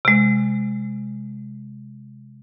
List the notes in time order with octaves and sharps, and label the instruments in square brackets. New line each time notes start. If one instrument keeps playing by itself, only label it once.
[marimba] C3 G#3